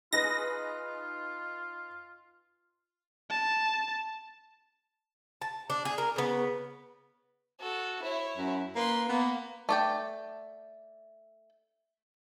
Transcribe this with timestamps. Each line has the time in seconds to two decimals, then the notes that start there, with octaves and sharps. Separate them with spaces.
0.13 D#4 F4 G#4 B4 A#6
3.30 A5
5.42 A5
5.70 D4
5.85 G#4
5.98 A#4
6.16 C#3 B3
7.60 F#4 A4
8.02 E4 C#5
8.37 F#2
8.76 A#3 B4 C6
9.09 A#3 B3
9.69 A3 D5 G5